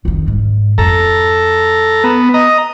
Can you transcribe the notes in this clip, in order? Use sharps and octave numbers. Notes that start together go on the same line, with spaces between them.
F2 D#3
G#2
F2 A4 A#5
B3
D#5 A#5